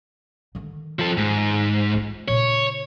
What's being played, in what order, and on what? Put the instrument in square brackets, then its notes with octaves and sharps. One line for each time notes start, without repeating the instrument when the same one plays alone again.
[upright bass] D3 D#3
[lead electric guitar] F3 A4
[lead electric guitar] G#2 [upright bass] D#3
[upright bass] G#3 F4
[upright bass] A#2 C#3 [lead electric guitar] C#5